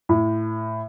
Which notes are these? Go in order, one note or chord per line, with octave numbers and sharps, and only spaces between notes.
A2